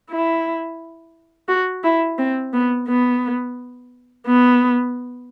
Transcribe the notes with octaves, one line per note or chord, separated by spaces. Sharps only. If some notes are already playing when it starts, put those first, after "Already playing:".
E4
F#4
E4
C4
B3
B3
B3